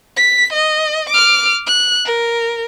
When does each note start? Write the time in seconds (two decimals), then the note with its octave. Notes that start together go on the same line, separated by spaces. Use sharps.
0.17 B6
0.53 D#5
1.10 D6 F6
1.66 F#6
2.05 A#4